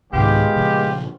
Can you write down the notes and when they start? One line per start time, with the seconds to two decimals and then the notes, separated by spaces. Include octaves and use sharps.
0.13 C2 G#2 D#3 G#3 B3 F4 G4
0.56 A#2 C#3 F3